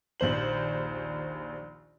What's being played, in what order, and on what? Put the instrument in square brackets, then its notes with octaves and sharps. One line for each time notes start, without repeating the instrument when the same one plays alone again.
[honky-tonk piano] A#1 D#2 C5 F#7